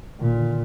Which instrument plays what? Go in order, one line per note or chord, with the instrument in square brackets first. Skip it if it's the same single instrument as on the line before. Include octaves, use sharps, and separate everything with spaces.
[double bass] A#2 [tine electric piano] D#3
[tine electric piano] D3